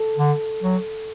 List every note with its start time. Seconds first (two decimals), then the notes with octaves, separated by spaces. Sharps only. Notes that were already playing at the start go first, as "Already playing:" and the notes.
Already playing: A4
0.18 D3
0.63 F#3